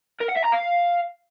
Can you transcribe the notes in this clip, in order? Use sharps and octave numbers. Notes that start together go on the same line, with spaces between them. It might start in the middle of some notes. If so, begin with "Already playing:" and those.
A#4
F#5
E5
A#5
F5